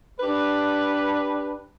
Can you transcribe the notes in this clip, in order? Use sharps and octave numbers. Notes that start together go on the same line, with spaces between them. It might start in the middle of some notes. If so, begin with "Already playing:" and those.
D4 G4 B4